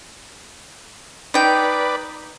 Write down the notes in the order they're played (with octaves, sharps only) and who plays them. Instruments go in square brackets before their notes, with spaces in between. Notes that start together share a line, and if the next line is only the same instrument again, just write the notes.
[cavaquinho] D#4 G5 [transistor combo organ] B4 D5